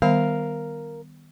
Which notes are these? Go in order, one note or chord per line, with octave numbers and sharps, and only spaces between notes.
D#3 G3 B3 A#4 F5